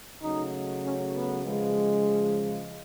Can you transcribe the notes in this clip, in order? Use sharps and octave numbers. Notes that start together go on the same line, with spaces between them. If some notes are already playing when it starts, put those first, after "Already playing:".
C#3 F#3 A3 D#4
C#4
B3
C#3 F3 G#3